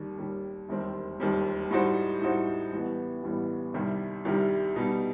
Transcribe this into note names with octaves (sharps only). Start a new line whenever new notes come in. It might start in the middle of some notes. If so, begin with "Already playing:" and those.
Already playing: D#2 D#3 G3
D#2 D#3 G3
E1 D#2 D#3 G3 C4
E1 D#2 D#3 G3 C4
A2 G3 D#4 F#4 C5
A2 G3 D#4 F#4 C5
A1 A2 G3 B3
A1 A2 G3 B3
C2 C3 D#3 G3
C2 C3 D#3 G3
B2 G3 D#4